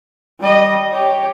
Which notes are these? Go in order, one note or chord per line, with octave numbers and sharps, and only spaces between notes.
G3 D#5
G4 C#5